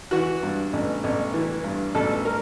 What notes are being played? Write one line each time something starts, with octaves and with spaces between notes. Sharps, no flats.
E3 F#4
G2
A1
A1
E3
G2
A1 A4
A#4